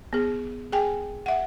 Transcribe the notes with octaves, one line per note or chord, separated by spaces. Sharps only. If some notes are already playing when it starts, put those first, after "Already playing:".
B3 G#4
G#4 G5 G#5
E5 F#5